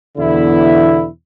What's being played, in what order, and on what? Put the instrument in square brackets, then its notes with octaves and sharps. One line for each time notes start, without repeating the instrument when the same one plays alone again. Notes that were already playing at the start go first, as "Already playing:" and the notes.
[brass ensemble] E2 B2 D3 B3 E4